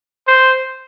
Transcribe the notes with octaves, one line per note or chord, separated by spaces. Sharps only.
C5